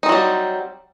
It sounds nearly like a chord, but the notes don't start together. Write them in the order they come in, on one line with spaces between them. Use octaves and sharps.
D#4 C4 F#3 G3